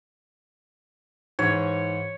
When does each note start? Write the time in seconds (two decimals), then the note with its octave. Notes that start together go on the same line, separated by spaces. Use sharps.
1.39 G#2 E3 C#5